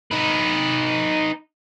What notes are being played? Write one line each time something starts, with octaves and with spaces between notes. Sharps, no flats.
D#4 B4